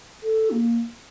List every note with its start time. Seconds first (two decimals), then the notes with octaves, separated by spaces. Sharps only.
0.23 A4
0.51 A#3